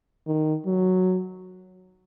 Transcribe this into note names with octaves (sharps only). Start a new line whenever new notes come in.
D#3
F#3